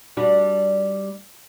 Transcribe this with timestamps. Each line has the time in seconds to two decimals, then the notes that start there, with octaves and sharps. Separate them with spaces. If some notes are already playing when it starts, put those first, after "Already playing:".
0.17 G3 D4 F#4